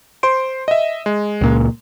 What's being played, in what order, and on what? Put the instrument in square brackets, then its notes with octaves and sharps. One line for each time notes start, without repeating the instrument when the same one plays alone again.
[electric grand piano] C5 C6 D7
D#5 E5
G#3
[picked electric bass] C#2 A#2